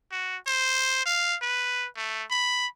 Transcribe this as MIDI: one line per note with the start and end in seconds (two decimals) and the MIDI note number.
0.12 0.37 66
0.47 1.04 72
1.06 1.35 77
1.42 1.87 71
1.97 2.24 57
2.31 2.67 83